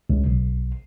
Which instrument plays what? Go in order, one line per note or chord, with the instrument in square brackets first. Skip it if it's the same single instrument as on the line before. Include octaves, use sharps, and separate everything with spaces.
[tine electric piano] C#2
B1